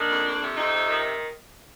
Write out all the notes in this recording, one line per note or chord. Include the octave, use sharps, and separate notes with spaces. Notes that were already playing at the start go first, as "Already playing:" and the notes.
Already playing: D#3 A#3 D4
F2
F2
C3
F2 C4 D#4
C3
D#3